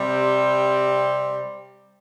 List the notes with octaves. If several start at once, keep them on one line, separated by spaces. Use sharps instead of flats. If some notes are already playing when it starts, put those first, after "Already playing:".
Already playing: C3 G3 C4